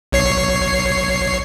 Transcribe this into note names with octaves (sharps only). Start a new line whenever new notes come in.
B1 C#5 C7